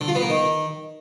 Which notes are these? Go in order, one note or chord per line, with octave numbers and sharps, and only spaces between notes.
D3
F4
B3
A#3
D#3